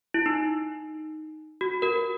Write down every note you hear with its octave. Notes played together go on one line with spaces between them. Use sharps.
E4
D#4
F#4
F#4 A#4